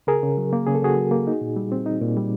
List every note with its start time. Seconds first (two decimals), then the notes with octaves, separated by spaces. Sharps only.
0.07 C#3 G#4 A#4
0.23 C#3
0.37 F#3
0.53 A#3
0.67 C#3 G#4
0.75 A4
0.82 C#3 F#4 G#4
0.96 F#3
1.11 A#3
1.27 D#4
1.41 A#2
1.56 G3
1.72 C4
1.86 D#4
2.01 A#2
2.16 G3